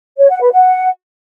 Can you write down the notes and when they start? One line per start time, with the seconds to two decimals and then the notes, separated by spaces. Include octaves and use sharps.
0.19 C#5
0.30 F#5
0.41 B4
0.52 F#5